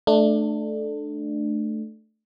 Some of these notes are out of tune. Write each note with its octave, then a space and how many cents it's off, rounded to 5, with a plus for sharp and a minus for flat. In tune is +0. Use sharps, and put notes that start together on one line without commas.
A3 -10 D4 +20